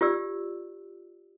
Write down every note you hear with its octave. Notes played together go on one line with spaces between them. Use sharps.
F4 G4 D5 E6